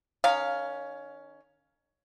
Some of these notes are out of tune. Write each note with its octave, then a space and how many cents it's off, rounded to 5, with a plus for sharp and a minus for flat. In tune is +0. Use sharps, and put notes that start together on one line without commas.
D#3 -25 C#4 +10 F5 +0